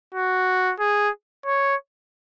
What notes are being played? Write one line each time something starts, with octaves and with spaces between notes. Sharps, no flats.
F#4
G#4
C#5